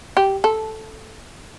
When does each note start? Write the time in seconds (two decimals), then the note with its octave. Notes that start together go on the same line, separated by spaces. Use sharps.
0.17 G4
0.44 A4